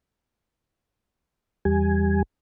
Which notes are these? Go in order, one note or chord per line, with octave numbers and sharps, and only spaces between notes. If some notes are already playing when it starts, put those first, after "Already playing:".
E2 G3 G#5